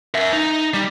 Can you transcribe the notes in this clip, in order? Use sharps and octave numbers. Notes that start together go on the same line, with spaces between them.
A#4 E5
D#4
G3